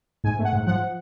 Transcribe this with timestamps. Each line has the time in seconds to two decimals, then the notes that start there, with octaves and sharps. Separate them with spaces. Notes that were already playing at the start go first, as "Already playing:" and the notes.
0.24 G#2 G#5
0.39 A3
0.45 F#5
0.53 G#2
0.67 F3 F#5